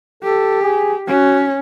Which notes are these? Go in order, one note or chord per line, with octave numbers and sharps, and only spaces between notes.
G4 A4
G#4
C#4 F#4